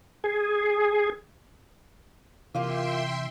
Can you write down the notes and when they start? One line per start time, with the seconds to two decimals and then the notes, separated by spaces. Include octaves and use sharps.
0.24 G#4
2.55 C3 E3 A#3 F4 G4 E5 G5 C6